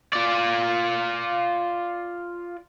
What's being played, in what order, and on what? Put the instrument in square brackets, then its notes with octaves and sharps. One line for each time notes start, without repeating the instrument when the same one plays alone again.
[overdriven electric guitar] F4 D5